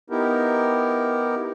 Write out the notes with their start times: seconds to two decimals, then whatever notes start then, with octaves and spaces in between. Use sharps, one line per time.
0.10 B3 D#4 E4 G4 A#4